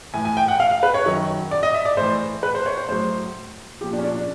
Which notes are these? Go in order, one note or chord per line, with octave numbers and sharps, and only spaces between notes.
A2 E3 G#5
G#5
G5
F#5
F5
F5
B4
C#5
F#2 D#3 F#3
D5
D#5
E5
D5
A2 E3 C5
B4
C5
C#5
C5
A2 F#3 C5
A#2 F3 G4
D4
C#4
D4
D4